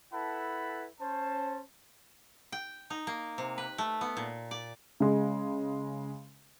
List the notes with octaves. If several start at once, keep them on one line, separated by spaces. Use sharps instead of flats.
E4 A4 B4 F#5 A5 B5
C#4 C5 A5
G5
D#4
A#3
C3
B4
A3
B3
A#2
D5
C#3 G#3